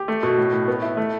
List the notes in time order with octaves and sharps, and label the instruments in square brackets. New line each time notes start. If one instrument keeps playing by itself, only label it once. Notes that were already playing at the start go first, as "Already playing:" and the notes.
Already playing: [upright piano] G4
A3
B2
A2
A2
B3
E4
A3